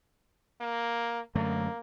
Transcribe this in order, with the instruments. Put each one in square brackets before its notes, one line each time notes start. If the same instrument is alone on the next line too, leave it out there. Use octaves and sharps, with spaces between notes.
[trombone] A#3
[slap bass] F#2 D3 A3 [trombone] A#3